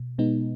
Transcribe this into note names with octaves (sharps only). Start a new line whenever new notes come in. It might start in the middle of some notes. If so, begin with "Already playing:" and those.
Already playing: B2
B2 G#3 B3 D#4